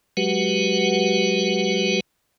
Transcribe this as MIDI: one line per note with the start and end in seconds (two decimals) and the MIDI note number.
0.17 2.00 54
0.17 2.00 56
0.17 2.00 66
0.17 2.00 67
0.17 2.00 71
0.17 2.00 78